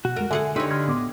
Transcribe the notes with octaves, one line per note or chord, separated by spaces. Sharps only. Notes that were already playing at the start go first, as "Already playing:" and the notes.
B2 F#4
F2 G#3 A#4
D3 G#4 E5 F#5 G#5
D3 D#4 G4 B4 C#5 D#5 C6 E6
C6 F6 G#6
A2 B3 D6